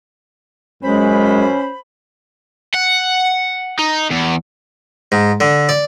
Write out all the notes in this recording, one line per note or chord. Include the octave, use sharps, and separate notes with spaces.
F#2 G#3 C#4 C5 B5
F#5
D#4
E2
G#2
D3
D5